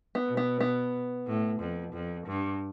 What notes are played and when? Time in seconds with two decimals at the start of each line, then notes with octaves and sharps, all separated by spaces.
0.15 B3
0.27 B2
0.37 B3
0.60 B3
1.27 A2
1.60 F2
1.94 F2
2.27 G2